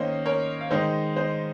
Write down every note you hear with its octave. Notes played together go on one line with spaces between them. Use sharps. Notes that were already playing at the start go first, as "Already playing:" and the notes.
Already playing: D#3 A#3 C#4 C5 D#5
A#4 C#5
F5
D#3 G#3 D#4 C5 D#5
C5 D#5